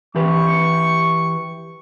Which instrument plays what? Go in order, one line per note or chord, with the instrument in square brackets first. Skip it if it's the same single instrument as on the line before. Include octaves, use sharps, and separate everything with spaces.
[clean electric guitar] E3 G4 B4 [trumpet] C#6